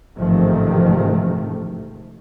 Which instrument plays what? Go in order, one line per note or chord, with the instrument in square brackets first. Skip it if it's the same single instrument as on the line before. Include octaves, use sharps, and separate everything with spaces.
[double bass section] A1 G#2 C3 D#3 F3 A3